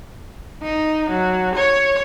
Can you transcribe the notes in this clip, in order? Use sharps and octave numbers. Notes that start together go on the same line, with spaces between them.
D#4
F#3
C#5